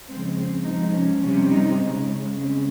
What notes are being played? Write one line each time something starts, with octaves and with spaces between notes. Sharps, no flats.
C#3 F3 G#3 C4
C4
C3 F3 G#3 D#4
C#4
C3 G3 C#4
D#4
C#3 G#3
C#3 G#3 C4